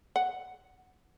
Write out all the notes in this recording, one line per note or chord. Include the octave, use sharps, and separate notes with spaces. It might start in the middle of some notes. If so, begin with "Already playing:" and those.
F#5